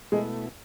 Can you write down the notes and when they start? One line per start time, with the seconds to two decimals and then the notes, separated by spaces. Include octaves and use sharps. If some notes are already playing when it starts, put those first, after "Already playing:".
0.12 B2 G#3 A3 E4